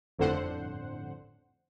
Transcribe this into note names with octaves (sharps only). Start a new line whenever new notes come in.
G1 F2 A2 D3 C5 F#5